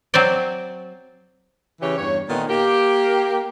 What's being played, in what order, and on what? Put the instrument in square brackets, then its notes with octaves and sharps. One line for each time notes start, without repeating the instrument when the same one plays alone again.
[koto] F#3 C4 C5 D5
[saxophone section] C#3 E3 G4 C#5
E2 G2 C#5
A#2 D#3 A3 B3
A#3 G4